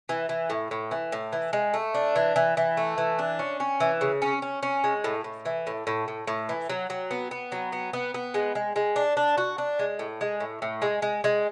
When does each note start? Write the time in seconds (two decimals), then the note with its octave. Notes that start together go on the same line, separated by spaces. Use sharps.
0.09 E3
0.29 E3
0.50 A2
0.71 A2
0.91 E3
1.12 A2
1.33 E3
1.53 G#3
1.74 A3
1.94 D4
2.16 E3
2.36 E3
2.57 E3
2.77 A3
2.98 E3
3.19 D4
3.39 C#4
3.60 C#4
3.80 E3
4.01 C#3
4.22 C#4
4.42 C#4
4.63 C#4
4.84 G#3
5.04 A2
5.24 A2
5.45 E3
5.67 A2
5.87 A2
6.08 A2
6.27 A2
6.49 E3
6.69 F#3
6.90 F#3
7.11 B3
7.31 B3
7.52 F#3
7.72 B3
7.93 B3
8.14 B3
8.34 G#3
8.55 G#3
8.76 G#3
8.96 D4
9.17 D4
9.38 F#4
9.58 D4
9.79 G#3
9.99 A2
10.21 G#3
10.40 A2
10.62 A2
10.82 G#3
11.02 G#3
11.24 G#3